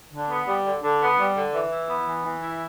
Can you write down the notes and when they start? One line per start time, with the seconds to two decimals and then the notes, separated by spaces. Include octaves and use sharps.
0.12 D3
0.30 B3
0.47 G3
0.65 D3
0.83 D3
1.01 B3
1.18 G3
1.36 D3
1.54 E3
1.71 E4
1.89 B3
2.07 E3
2.25 E3
2.42 E4